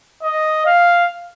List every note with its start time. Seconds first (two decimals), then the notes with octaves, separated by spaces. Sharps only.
0.23 D#5
0.66 F5